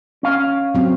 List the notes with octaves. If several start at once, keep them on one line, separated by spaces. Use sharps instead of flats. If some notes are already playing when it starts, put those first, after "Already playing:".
C#4 F5
F#3 C4